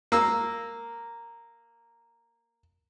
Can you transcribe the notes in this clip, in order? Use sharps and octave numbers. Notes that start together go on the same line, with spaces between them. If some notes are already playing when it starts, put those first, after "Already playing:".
A#3 E6